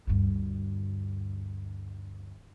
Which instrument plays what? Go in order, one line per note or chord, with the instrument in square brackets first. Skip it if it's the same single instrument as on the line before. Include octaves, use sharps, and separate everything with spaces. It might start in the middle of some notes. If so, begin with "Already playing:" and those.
[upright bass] D2 G2